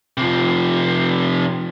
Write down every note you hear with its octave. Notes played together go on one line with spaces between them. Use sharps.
C3 F3